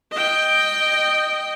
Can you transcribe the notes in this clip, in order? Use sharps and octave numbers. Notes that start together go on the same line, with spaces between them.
D#5 G5